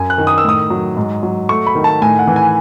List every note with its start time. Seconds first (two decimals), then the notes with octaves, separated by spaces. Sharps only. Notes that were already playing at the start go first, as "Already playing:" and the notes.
Already playing: F#2 G#5
0.10 F#6
0.18 D#3
0.27 D#6
0.38 E6
0.44 A2 D#6
0.70 F#3
0.97 G#2
1.23 F#3
1.49 A3 C#6
1.67 B5
1.75 D#3
1.84 A5
2.01 A2 G#5
2.19 F#5
2.27 E3
2.36 G#5